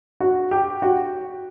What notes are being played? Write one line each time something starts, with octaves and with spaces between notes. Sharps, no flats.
F#4
G4
F#4